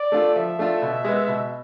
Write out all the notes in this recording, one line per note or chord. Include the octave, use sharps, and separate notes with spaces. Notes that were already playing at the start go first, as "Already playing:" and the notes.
Already playing: D5
A3 D4 F4 A4
F3 E5
A3 D4 F4 A4
B2
G#3 B3
B2